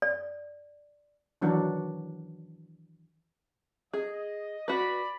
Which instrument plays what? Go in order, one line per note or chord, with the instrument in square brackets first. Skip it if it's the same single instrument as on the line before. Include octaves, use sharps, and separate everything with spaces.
[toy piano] D5
[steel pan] D#3 E3 F#3 D4 F#4
[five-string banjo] G#4 [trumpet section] D#5
[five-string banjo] F#4 B4 [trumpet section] D5 B5